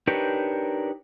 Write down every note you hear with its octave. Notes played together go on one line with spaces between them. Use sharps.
D4 D#4 G4 A#4 B4 C#5